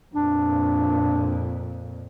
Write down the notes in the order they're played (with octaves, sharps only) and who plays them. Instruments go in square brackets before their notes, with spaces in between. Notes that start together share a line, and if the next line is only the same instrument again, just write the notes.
[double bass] F2 A#2 [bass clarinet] D4